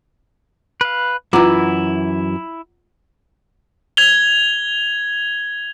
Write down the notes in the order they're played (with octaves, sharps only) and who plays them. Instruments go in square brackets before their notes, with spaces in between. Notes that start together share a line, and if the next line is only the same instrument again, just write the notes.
[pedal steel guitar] B4 F5
[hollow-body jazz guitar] F#2 E3 [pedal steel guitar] E4 [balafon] F4 [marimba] F#5 A#5 D6
[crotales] G#6 F7 G7